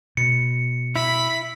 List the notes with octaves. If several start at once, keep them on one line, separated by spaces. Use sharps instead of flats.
B2 C#7
E4 B5